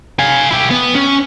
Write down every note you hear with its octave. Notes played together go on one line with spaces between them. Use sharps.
F5 G#5
E4 G4
B3
C#4